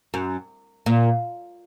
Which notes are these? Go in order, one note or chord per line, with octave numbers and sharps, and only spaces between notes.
F#2
A#2